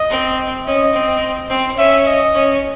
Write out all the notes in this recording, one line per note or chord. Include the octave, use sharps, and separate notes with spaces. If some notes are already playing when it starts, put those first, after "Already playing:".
Already playing: D#5
C4
C#4 D#5
C4
C4
C#4 E5
D#5
C#4